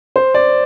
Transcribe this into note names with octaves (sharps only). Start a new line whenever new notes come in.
C5
D5